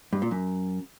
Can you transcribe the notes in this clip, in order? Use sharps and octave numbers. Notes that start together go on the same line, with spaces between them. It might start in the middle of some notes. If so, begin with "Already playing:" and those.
G2
A#2
F#2